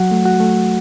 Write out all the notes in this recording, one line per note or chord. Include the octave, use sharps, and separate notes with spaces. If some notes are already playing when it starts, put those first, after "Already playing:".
Already playing: F#3 F#4 F#5
A3
F#4 F#5
A3